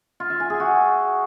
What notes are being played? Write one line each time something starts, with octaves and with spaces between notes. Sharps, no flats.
F4
E5
G#5
G#4
F#4